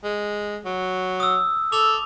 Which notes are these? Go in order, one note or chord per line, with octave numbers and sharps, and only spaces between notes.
G#3
F#3
D#6 E6
A4 D6 F7